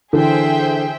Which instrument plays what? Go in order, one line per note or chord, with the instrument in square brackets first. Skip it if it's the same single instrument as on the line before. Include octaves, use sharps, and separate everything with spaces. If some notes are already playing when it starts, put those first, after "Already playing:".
[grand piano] D3 E3 [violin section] G#4 C5 E5 G5